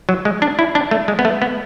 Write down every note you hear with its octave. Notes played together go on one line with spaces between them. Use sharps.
F#3
G#3
D4
E4
D4
A3
G#3
B3
A3
B3